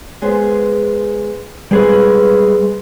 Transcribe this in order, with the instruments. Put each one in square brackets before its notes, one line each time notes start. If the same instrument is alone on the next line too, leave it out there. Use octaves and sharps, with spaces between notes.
[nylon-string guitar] G#3 B3 C5
[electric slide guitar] G3 G#4 B4 [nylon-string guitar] G#3 B3 C4